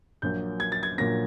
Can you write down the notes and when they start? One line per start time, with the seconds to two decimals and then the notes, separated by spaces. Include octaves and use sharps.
0.22 A#1 A#2 F#3 A#3 G6
0.60 G#6
0.72 A6
0.83 G#6
0.98 A#1 A#2 F#3 A#3 A#6